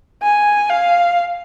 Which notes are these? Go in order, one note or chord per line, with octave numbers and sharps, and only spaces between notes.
G#5
F5